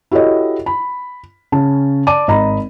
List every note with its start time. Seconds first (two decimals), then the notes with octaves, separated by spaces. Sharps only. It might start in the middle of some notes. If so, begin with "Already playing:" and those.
0.11 E4 F#4 G4 A4 C#5 D#5
0.66 B5
1.52 C#3 C#4 A5
2.07 D5 A5 D6 D#7
2.28 G#1 D#5 A#5 B5